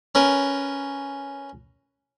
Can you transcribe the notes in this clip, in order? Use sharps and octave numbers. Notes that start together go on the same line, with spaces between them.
C#4 A#4 B4